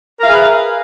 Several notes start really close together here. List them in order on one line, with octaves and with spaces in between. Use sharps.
A#4 F5 E5 G#4 B4